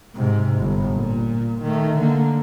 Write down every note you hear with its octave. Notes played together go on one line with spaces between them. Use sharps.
G#2 C3
G1
A#2
D#3 A3
D3 A#3